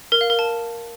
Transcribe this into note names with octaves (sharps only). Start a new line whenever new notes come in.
A#4
F5
A#4
A5